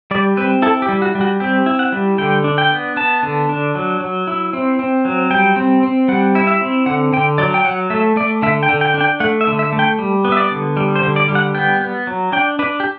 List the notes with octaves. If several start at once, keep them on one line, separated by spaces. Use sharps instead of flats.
G3 D5
C4 B4
E4 A4
G4
G3
F#4
G3
F#4
C4 G4
E4
F#5
G3
D3 G5
D4
G5
B3
B3 A5
D3
D4
F#3
F#3
E4
C4
C4
F#3
G3 G5
C4
C4
G3 F#5
E4
E5
C4
D3 F#5
D3 G5
F#3 D5
G5
F#3 F#5
A3 E5
A3 D5
D3 E5
G5
D3
G5
D4
G5
A3 F#5
E5
D3
E5
A3
G5
G3
B3
E5
D5
D3
G3
C5
D3
D5
G3
F#5
B3 G5
B3
F#3
D4 G5
D4 B4
G4